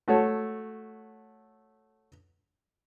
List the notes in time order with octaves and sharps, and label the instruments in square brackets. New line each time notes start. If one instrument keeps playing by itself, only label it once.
[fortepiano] A3 F#4 A4 C#5